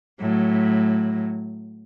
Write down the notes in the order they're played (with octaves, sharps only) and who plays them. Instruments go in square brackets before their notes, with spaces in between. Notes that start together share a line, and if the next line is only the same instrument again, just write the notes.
[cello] A2 F#3